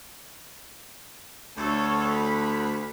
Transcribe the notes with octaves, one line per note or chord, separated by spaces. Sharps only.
D2 A4 C#5
B5